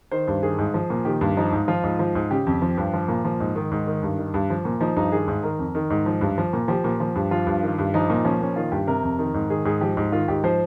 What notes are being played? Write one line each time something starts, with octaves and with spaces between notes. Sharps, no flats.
D#3 C5
G2
D#3 G#4
G#2
F3
A#2
D#3 G4
G2
F3 D#4
G#2
F3 F4
G#2
F3
G#2
C#3 G4
F2
F3
G2
F3
A#2
F3
G#2
D#3
G#2
D#3
G2
D#3
G2
F3
A#2
F3 D#4
G2 D#4
D#3 G#4
G#2
D#3 A#4
F2
D#3
G#2
F3
G2
F3
A#2
F3 G4
A#2
F3
G2
F3 F4
G2
D#3
G2
F3 D#4
A#2
F3 C#4
A#2 C#4
D#3 F4
G2 G4
C3 A#4
F2
D#3
G#2
D#3 G#4
G#2 G#4
F3 G4
G#2
D#3 F4
G#2 G4
F3 C5